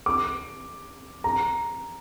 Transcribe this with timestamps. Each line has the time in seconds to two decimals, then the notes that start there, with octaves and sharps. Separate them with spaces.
0.06 D6
1.24 A#5